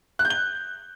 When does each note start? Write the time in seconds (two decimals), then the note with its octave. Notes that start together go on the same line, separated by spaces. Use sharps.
0.19 F#6
0.25 G6
0.30 G7